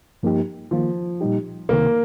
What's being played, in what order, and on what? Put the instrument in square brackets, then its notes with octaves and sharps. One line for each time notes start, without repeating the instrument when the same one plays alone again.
[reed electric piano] G2 F3 A#3 D#4 G4
[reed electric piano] D#3 A#3 F4 [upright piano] F3
[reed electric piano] A#2 G3 D#4 G4
[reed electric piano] C2 C3 D#3 [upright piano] A#3